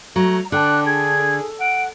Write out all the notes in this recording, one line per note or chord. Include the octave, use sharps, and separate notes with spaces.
F#3 A3 A#5
D3 D4 D5 G5 A5 F#6
G#4 G#6
A4
F#5 D7